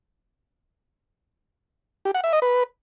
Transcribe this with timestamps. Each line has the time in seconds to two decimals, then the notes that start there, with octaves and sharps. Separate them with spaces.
2.05 G4
2.14 F#5
2.24 E5
2.33 D#5
2.42 B4